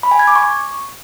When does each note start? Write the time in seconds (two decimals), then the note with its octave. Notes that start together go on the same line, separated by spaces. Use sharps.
0.03 B5
0.11 G#5
0.19 G#6
0.27 D6
0.36 C#6